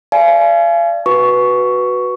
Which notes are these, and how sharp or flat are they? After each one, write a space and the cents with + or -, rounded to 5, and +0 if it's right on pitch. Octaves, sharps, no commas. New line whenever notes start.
D5 +0 F5 -40 G#5 +30
F#4 +0 B4 +0 C#6 +10